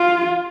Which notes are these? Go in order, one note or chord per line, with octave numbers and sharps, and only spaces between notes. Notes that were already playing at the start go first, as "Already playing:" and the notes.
Already playing: F4